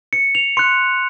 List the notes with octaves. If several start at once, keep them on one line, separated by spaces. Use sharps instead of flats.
C#7
F7
C6 F#6 C#7